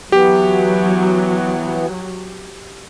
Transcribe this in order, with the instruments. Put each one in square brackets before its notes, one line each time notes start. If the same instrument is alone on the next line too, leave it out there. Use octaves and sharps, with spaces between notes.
[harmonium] E3 B3 [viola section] F#3 [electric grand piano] G4